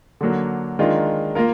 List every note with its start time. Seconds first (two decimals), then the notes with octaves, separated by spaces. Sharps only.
0.21 D3 F#3 A#3 D4
0.79 D#3 G#3 D4 F4 A#4
1.35 A#3 F4 A#4